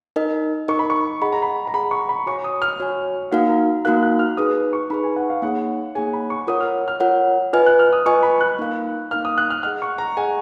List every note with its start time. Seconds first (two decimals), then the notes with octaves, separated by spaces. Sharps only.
0.16 D#4 A#4 D#5
0.68 D#4 A#4 D#5 C#6
0.79 B5
0.90 C#6
1.22 G#4 D#5 F#5 B5
1.32 A#5
1.42 B5
1.67 A#5
1.74 G#4 D#5 F#5 B5
1.91 C#6
2.09 B5
2.26 F#4 C#5 G#5 C#6
2.44 D#6
2.62 F6
2.80 F#4 C#5 G#5
3.32 A#3 D#4 F#4 A#4 F5 F#5
3.49 A#5
3.85 A#3 D#4 F#4 A#4 F5 F#6
4.03 F#6
4.19 F6
4.37 D#4 G#4 B4 D#6
4.73 C#6
4.90 D#4 G#4 B4 B5
5.04 G#5
5.16 F#5
5.30 F5
5.42 A#3 D#4 G#4 C#5 F#5
5.95 A#3 D#4 G#4 C#5 G#5
6.13 B5
6.30 C#6
6.47 F4 A#4 C#5 F#5 D#6
6.60 F6
6.88 F6
7.00 F4 A#4 C#5 F#5
7.53 F4 B4 D#5 G#5 F6
7.66 F#6
7.79 F6
7.93 D#6
8.06 F4 B4 D#5 G#5 C#6
8.23 B5
8.41 F#6
8.58 A#3 D#4 A#4 F5
9.11 A#3 D#4 A#4 F5 F6
9.25 D#6
9.38 F#6
9.50 F6
9.63 G#4 D#5 F#5 F6
9.82 C#6
9.98 A#5
10.17 G#4 D#5 F#5 G#5